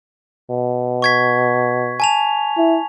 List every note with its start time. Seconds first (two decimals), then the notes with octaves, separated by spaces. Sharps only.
0.50 B2
1.02 C#6 G#6 B6
2.00 G#5 A5 F7
2.57 E4